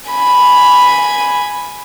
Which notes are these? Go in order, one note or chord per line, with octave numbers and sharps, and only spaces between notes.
G#5 B5